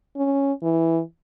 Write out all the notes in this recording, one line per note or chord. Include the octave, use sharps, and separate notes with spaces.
C#4
E3